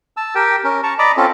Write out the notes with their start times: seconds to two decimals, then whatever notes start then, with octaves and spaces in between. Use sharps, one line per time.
0.17 A5 E6
0.35 G4 A#4 G5
0.64 C#4 A#4
0.83 A5 A#5 C#6
0.99 D5 D#5 A#5 B5 D6
1.17 C4 C#4 F4 A4